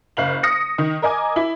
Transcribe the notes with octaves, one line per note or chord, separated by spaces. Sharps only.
F#1 F5 F#7
D#6 A#6 C#7
D#3
A#4 D#5 G#5 D6
E4